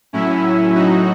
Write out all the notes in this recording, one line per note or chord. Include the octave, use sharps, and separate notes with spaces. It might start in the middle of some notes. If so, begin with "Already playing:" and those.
A2 F#3 C#4 E4
D#4 F#4